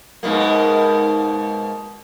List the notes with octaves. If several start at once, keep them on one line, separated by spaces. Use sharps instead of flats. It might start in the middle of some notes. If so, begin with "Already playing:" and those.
G#2 B2 A#3